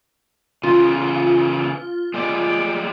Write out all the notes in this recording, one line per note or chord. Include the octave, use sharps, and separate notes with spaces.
C#3 E3 F4
G#3 G4 D5